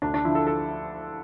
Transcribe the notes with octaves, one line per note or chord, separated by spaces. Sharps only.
D2 D4
D4
D3 F3 E4
A4
A4